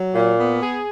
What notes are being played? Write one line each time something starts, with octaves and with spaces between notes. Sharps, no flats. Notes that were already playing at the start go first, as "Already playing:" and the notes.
Already playing: F#3
A#2
B3
G#4